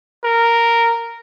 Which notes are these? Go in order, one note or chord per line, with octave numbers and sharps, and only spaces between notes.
A#4